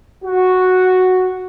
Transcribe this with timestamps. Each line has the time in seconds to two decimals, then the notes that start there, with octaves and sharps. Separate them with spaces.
0.24 F#4